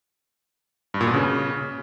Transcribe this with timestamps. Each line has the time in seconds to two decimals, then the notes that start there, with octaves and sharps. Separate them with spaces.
0.94 G2
1.01 A#2
1.07 B2
1.14 C#3